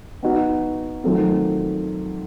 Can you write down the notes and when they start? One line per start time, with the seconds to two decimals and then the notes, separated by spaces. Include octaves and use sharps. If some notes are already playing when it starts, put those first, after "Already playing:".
0.23 B3 D#4 F#4
1.04 D#3 F#3 A3 C4 F4